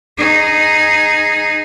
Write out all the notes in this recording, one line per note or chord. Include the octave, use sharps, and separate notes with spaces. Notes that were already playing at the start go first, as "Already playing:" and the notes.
D#4 G#4